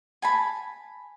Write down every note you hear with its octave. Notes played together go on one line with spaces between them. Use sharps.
G#5 A5 B5